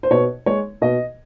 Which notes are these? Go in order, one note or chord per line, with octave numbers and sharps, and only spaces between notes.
C5
B2 C#5
G#3 C#5
B2 D#5